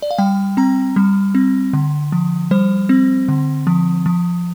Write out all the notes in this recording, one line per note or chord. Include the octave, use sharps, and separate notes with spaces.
D5
F5
G3 G5
C4 A#5
G3
C4
D3
F3
G3 C5
C4
D3
F3
F3